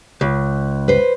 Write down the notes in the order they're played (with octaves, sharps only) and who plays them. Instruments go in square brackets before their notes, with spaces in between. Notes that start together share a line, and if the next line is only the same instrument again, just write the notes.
[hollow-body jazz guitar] C#2
[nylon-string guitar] B4 C5